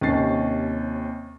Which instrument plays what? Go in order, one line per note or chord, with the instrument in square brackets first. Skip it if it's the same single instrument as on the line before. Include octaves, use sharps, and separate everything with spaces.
[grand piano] D#2 C3 C#4 A6 C7